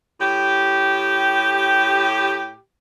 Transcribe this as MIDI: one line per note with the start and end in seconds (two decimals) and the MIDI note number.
0.20 2.55 45
0.20 2.55 67